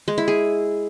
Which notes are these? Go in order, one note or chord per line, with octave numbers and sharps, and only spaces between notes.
G#3
E4
G#4